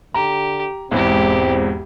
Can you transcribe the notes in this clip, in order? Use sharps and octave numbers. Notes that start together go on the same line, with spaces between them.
D3 G4 A#5
E1 E2 G#2 C4 E4 G4